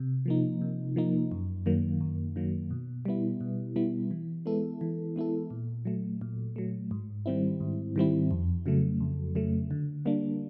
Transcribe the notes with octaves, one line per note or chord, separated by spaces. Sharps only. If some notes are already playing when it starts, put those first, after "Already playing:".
Already playing: C3
F3 A#3 D#4
C3
F3 A#3 D#4
F#2
D#3 F#3 A#3
F#2
D#3 F#3 A#3
B2
G3 B3 E4
B2
G3 B3 E4
E3
G#3 B3 E4 A4
E3
G#3 B3 E4 A4
A#2
F#3 A3
A#2
F#3 A3
G#2
D#3 G3 C4 E4
G#2
D#3 G3 C4 E4
F2
C#3 F#3 A3
F2
C#3 F#3 A3
D3
G3 A#3 D4